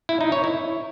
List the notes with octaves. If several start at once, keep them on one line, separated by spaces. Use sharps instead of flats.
E4
D#4
C#5
E4